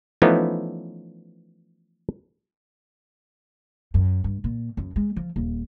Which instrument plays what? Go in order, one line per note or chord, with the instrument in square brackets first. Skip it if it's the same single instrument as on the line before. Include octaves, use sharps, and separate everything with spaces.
[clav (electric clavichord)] E3 F3 A3 B3 C#4 D#4
[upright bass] F#2
G2
A#2
F#2
G#3
F3
D#1